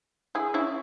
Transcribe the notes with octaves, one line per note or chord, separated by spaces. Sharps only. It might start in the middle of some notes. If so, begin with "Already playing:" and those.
E4 G#4
C#4 E4